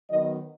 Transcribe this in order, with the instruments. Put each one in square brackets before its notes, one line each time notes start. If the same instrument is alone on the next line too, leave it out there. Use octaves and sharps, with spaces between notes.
[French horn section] D#3 F#3 B3 D#5